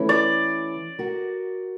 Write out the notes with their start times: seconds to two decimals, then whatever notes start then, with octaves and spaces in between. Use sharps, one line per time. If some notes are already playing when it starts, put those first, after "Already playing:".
Already playing: E3 A3 C#4 E4
0.09 D5
0.99 F#4 A#4